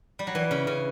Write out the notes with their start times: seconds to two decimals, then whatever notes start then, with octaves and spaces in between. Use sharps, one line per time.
0.19 G3
0.27 F#3
0.35 E3
0.51 C#3
0.67 C#3